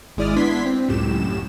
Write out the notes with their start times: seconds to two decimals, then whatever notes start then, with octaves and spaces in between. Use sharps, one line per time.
0.17 G#1 G#3 E4 D5 D#6 F6
0.36 B3 D4 E4 C6 G#6 B6
0.65 C4
0.88 C#2 F#2 A2 G4 E7